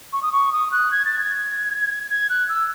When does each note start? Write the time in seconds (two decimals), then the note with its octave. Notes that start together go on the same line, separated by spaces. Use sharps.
0.13 C#6
0.22 D#6
0.32 C#6
0.53 D#6
0.72 F#6
0.92 G#6
1.05 A6
1.19 G#6
2.10 G#6
2.29 F#6
2.49 E6